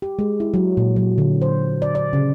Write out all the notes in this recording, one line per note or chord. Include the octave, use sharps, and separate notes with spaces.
G4
G#3
E4
F#3
A#2
F#3
D3
C5
D5
D5
C#3